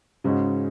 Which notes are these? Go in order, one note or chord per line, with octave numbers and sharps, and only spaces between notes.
G#2 C#3 G#3 C#4 F#4